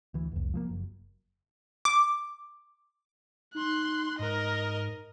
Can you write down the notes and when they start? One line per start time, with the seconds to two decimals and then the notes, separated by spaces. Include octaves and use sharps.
0.14 D2 E3
0.32 F1 C2
0.54 F3 G#3 A#3
0.69 F#1
1.85 D6
3.55 D#4 C6 F#6
4.19 G#2 A#4 D#5